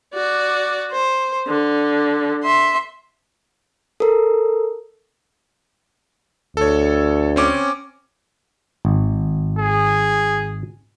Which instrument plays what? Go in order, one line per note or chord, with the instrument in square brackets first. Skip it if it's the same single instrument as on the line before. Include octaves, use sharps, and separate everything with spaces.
[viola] F#4 D5
C5
D3
E5 C6
[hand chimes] A4 A#4
[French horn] D2 [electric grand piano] A4 C#5
[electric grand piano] C4 C#4 D6
[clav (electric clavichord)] G#1
[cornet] G#4